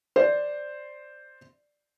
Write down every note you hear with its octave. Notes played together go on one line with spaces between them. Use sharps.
C5 D5